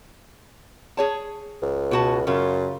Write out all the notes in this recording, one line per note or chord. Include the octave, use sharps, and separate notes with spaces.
G#4 C#5 A5
C#2
B2 F#4 A5
F#2 C#3 F4